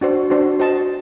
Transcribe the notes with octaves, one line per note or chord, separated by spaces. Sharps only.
D4 F#4 C5
D4 F#4 C5
F#4 C5 D#5 A5